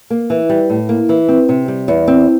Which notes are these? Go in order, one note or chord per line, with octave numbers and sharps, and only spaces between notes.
A#3
E3
G3
A2
A#3
E3
C4
C3
G3
E2
C4